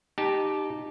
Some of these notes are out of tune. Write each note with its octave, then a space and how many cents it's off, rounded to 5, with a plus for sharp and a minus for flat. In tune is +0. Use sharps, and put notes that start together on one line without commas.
D#4 -15 G4 +0 A5 -30